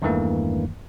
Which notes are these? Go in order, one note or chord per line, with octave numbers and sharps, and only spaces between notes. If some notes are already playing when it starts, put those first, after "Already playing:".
E2 G2 D#3 E3 A3 A#3